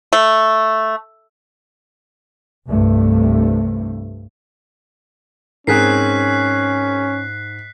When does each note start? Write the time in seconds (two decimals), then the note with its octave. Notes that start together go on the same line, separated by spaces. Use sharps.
0.13 A3
2.66 C2 G2 C3 A3
5.67 G#2 C4 C#4 G#4 A#4 F#6 B6 C7